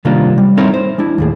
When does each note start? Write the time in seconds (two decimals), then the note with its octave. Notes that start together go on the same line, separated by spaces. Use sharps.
0.05 C3 D#3 G3 A#3 D4 F4
0.38 G3
0.57 C4 D#4 E4 A#4 C#5
0.74 C5
0.98 G#3 D4 E4
1.18 D#2 A2 G#4